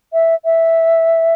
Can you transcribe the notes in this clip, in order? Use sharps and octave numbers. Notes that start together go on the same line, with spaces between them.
E5
E5